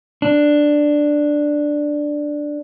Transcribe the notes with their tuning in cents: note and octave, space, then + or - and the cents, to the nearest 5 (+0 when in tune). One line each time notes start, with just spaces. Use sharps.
D4 +5